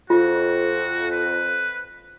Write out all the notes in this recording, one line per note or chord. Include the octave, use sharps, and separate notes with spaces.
F2 F4 F#4
B4